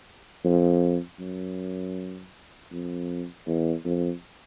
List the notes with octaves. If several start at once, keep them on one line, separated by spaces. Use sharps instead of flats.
F2
F#2
F2
E2
F2